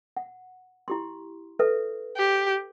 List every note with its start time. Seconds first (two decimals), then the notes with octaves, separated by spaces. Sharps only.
0.17 F#5
0.88 E4 G4 C6
1.59 A4 B4 E5
2.17 G4